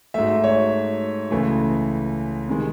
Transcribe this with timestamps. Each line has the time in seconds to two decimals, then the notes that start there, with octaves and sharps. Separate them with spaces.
0.14 G#2 F#3 A3 E5
0.44 C#5
1.31 C#2 C#3 E3 A3
2.49 C3 D#3 G#3